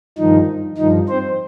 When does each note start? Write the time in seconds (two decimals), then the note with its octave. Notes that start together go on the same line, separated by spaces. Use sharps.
0.18 G2 D#3 F3 D#4
0.78 G2 D#3 F3 D#4
1.09 C4 C5